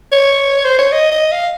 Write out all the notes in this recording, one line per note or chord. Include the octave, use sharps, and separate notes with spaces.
C#5
C5
C#5
D#5
D#5
F5